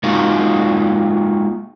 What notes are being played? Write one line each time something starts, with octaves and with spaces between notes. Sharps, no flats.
G#3 A#3 D#4 F4 F#4